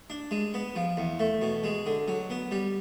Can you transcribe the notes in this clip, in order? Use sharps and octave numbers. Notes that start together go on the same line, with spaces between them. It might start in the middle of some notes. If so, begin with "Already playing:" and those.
D4
G#3
B3
F3
E2
A3
B2
G#3
D3
F#3
B3
G3